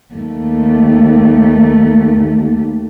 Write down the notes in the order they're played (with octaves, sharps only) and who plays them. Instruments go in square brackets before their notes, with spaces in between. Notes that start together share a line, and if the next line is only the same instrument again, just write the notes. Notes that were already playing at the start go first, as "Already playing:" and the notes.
[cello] D#2 A3